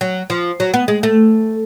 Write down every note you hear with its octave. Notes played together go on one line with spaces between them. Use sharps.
F#3
F3
F#3
B3
G#3
A3